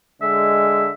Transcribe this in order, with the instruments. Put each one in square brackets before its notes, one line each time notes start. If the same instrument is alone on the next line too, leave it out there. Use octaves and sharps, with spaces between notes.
[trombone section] D3 G#3 [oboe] E5